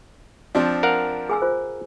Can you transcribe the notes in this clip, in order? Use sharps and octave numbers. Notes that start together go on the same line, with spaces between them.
F3 C4 D4
A#4 F5 F#5
G#4 G#5 E6
F4 C5